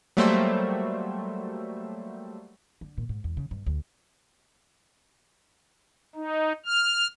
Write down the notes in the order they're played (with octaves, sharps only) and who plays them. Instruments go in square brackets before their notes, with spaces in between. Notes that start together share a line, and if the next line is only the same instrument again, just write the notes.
[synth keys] F#3 G3 A3 A#3 C5 E5
[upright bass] D3
A#2
G#2
E2
C#3
G2
D2
[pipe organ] D#4
F6